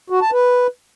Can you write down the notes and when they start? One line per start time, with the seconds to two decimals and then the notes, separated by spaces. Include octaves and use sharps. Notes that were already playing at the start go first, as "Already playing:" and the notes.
0.10 F#4
0.21 A5
0.32 B4